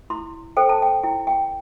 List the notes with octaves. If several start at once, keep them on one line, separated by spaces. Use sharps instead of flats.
E4 C6
A4 C5 G5
A5
G5
E4 G5
G5